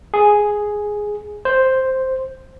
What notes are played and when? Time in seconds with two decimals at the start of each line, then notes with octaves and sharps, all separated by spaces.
0.14 G#4
1.45 C5